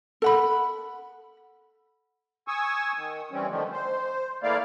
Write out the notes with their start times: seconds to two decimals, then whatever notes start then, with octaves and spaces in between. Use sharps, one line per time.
0.22 A4 F#5 B5
2.48 G#5 C#6 D#6 E6
2.96 D#3
3.32 E3 G3 C4 C#4
3.49 D3 D#3 F3 A3
3.72 C5
4.43 E3 A3 A#3 E4 D5 F5